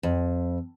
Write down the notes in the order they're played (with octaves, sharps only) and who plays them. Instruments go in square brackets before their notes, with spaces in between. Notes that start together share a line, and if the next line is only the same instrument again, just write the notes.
[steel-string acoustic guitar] F2